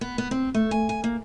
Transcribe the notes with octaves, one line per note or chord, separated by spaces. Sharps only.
B3
B3
C4
A3
G#5
G#5
A#3